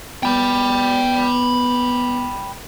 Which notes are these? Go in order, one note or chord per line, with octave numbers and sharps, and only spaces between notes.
B3 G5 B5